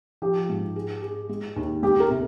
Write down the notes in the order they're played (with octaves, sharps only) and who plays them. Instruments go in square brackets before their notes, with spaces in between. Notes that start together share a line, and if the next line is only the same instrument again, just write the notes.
[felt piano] F3 [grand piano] G4
[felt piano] G#2
G#4
G#4
G#3
D#2
[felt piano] C#2 [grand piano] G4
[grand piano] A#4
[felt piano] C3